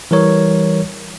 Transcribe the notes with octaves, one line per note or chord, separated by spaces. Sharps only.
E3 G3 A#4 C#5